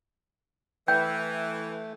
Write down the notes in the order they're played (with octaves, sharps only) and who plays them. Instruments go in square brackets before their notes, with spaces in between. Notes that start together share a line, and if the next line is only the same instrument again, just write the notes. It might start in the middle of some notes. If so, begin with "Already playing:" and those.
[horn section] E3 [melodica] A3 [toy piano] G5 [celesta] G6